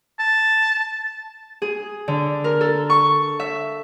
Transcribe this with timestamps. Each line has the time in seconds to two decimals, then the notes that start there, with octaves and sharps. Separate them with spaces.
0.19 A5
1.62 G#4
2.08 D3
2.44 A#4
2.61 A4
2.90 C#6
3.40 E5